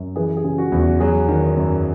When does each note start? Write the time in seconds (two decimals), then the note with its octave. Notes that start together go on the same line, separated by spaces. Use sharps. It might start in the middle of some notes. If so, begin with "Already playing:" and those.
Already playing: F#2
0.16 E3 G#4 B4
0.37 G#4
0.44 C#3
0.58 F#4
0.72 E2
0.79 F#4
1.00 F#3 G#4
1.28 D#3
1.57 F#2